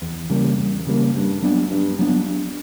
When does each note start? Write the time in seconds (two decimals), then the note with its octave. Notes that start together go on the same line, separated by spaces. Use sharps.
0.02 E2
0.30 C#3 G3 A#3
0.58 E2
0.87 C#3 G3 A#3
1.15 G2
1.42 F#3 B3 D4
1.71 G2
1.99 F#3 B3 D4